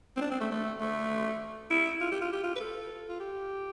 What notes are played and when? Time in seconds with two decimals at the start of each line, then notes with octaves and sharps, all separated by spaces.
0.17 C4
0.21 D4
0.31 C4
0.41 A3
0.51 A3
0.80 A3
1.70 E4
2.01 F4
2.11 G4
2.21 F4
2.33 G4
2.43 F4
2.56 B4
2.60 A4
3.09 F4
3.20 G4